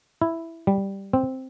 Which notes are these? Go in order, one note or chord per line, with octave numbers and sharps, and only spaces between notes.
E4
G3
C4